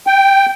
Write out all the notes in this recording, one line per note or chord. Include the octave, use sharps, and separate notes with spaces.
G5